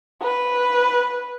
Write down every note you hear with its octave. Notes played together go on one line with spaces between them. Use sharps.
B4